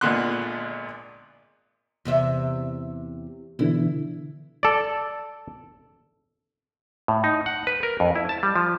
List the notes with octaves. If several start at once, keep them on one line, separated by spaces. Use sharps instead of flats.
G#1 A#2 D3 B3 C6 F#6
E2 C3 E5
B2 D3 E3 E4
A4 D5
A2
D#4
F#5
B4
A#4
F2
E4
A5
G3
F3